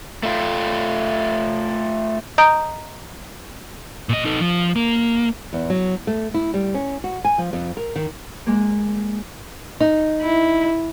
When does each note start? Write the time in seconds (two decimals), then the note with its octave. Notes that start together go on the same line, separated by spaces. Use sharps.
0.23 A3 F4
2.38 D#5 A#5 D#6 G6 D7
4.09 A#2 D#5
4.25 D#4 A4
4.40 F3
4.76 A#3
5.53 E2
5.70 F#3
6.07 A3
6.34 E4
6.54 G3
6.74 C#4
7.04 F#4
7.25 G#5
7.38 F3
7.53 F2
7.77 A#4
7.96 D#3
8.46 G#3 A#3
9.80 D#4
10.21 E4